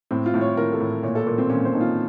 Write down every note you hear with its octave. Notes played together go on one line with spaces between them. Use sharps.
A2 C4
F4
A2
C#5
A2 A#4
A4
A2
A#2 C#5
A4
A#2 A#3
C4
A#2 C#4
C5
A#2 D#4
F4